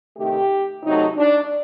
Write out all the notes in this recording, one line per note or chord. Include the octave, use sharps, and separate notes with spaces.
C3 D#3 A3 G4
C3 F#3 A3 D#4
D4